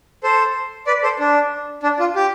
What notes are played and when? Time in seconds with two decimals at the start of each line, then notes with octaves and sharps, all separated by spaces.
0.23 A4 C5
0.87 B4 D5
1.03 A4 C5
1.19 D4
1.83 D4
2.00 F4
2.16 G4